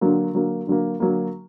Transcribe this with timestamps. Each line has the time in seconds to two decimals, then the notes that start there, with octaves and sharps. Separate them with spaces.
0.01 D3 F#3 A#3
0.34 D3 F#3 A#3
0.67 D3 F#3 A#3
1.00 D3 F#3 A#3